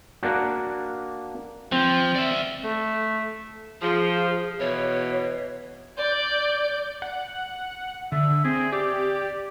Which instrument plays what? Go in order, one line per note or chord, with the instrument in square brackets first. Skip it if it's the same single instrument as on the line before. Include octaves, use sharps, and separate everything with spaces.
[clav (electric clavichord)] A#3 D4 F#4
[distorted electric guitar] F3 [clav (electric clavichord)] C4
[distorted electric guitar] D5 E5
[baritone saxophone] A3
[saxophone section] F3 [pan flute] G#4
[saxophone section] B2 E3 [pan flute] C#5
[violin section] D5 G6
[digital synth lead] F#5
[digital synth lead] D3 [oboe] E5
[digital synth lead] C4 [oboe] G#4
[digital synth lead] G4 [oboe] D5